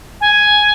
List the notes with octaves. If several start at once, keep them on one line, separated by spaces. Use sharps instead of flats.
G#5